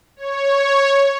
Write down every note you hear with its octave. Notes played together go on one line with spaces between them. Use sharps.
C#5